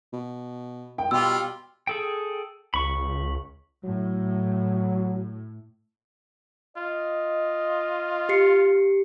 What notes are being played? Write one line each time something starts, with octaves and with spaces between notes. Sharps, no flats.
B2
G5
B2 G3 F4 E6
G#4 A4 G5
C#2 B5 C#6
A2 F#3
F4 D#5
G4 C7 C#7